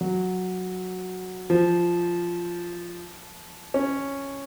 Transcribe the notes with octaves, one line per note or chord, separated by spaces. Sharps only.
F#3
F3
C#4